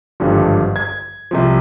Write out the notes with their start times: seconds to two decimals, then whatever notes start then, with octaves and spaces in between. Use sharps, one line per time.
0.20 G#1 G2 D3 F3
0.76 G#6
1.31 C2 C3 F3